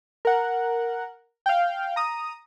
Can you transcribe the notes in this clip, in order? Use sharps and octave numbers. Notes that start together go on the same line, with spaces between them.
A#4 F#5
F5 G5
A#5 D#6